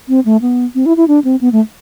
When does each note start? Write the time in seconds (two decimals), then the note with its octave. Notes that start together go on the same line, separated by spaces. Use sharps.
0.09 C4
0.25 A3
0.42 B3
0.75 C4
0.86 E4
0.97 E4
1.08 D4
1.24 C4
1.41 B3
1.52 A3